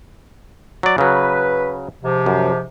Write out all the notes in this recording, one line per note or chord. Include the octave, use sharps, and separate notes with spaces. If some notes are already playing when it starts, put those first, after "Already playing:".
F#3 D5
C#3 F#3 B4
G#2 C3 F3
F#2